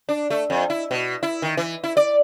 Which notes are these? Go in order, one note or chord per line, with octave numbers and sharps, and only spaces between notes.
D4
A3
F2
E4
B2
E4
D#3
E3
E4
D5